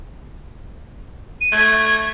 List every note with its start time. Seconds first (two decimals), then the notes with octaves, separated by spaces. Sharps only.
1.41 D#7
1.52 A3 G#6